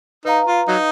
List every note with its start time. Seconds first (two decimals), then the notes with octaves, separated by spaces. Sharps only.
0.25 D#4 B4 F5 A#5
0.47 F4
0.68 F#3 D#4